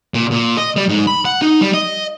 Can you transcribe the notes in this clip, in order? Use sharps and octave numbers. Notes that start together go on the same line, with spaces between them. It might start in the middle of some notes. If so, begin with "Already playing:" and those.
A#2
A#2
D#5
G3
G#2
B5
F#5
D#4
G3
D#5